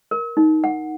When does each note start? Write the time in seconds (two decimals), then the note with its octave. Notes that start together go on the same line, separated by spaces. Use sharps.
0.11 A#4
0.37 D#4
0.64 F#5